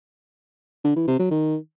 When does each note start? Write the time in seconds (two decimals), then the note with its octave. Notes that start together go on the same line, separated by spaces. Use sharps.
0.84 D3
0.96 E3
1.08 C3
1.19 F#3
1.31 D#3